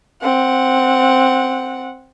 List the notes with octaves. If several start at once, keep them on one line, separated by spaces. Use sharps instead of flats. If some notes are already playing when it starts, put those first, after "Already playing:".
C4 F#5